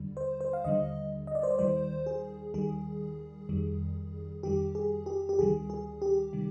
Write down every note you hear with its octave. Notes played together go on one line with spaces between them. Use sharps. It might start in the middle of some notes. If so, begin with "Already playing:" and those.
Already playing: D#2 D3 G3
C5
C5
F5
D#2 D3 G3 D#5
D#5
D5
C5
D5
D#2 D#3 G3 C5
G#4
D#2 D#3 G3 G#4
F2 D#3 G3
F2 D#3 G3 G4
G#4
G4
G4
D2 C3 D#3 G3 G#4
G#4
G4
C3 D#3 G3